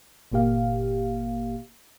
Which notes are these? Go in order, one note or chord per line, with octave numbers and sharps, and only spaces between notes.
G1 A#2 A#3 G4 F5